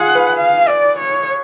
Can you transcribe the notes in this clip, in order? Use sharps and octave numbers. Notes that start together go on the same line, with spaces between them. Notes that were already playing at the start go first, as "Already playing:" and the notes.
Already playing: F4 G#4 F#5
B4
F5
D5
C#5